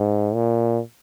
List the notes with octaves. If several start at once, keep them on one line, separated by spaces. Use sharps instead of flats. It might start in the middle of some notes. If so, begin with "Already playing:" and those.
Already playing: G#2
A#2